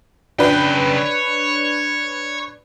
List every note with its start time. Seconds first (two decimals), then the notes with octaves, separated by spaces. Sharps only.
0.39 C#3 D4 B4 G5
0.98 C#5